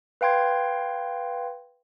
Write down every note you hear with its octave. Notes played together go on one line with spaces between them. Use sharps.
B4 F5 G5 C6 G#6